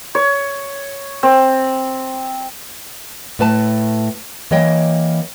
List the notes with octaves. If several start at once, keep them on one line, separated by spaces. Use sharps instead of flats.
C#5
C4
A2 A3 B4 A5
E3 A#3 C#5 D#5 G5